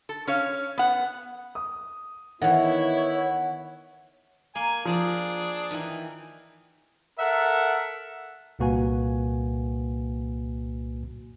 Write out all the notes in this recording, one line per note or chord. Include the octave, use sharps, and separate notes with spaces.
A4
C#4 C#5 F5
B3 F#5
D#6
D#3 E3 B3 E4 C#5 F#5
A#3 G#5
F3 D4 G#4
D#3 E3
A4 A#4 E5 F#5
C2 A#2 A#3 F#4 B4 G#5